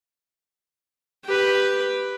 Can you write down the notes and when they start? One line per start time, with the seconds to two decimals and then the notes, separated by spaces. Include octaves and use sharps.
1.25 G4 B4